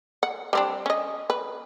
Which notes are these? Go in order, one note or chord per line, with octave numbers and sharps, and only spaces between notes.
F#5
G3 C4 D4
C#4 D#5
B4